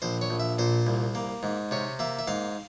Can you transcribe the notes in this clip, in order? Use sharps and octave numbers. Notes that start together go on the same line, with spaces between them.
A#1 C5
C#5
A#1
E5
A#2 C5
C2
A#3
G#2
C3 C#5
A#3 E5
E5
G#2 F5